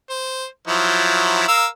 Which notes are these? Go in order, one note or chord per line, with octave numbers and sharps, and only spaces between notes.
C5
F3 F#3 E4
A#4 F5 E6